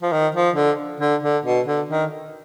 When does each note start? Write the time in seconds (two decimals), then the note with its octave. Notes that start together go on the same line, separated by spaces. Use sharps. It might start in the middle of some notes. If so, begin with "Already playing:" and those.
0.02 F3
0.12 D#3
0.35 F3
0.56 D3
1.00 D3
1.23 D3
1.45 B2
1.67 D3
1.89 D#3